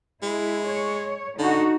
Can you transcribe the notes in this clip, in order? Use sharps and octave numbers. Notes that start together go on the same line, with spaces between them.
G#3 E4
C#5
D3 D#4 F#4